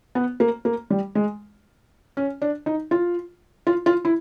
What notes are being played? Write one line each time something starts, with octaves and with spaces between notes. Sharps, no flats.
B3
A#3
A#3
G3
G#3
C#4
D4
D#4
F4
F4
F4
E4